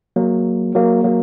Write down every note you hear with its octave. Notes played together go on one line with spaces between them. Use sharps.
F#3 A#3
F#3 A#3
F#3 A#3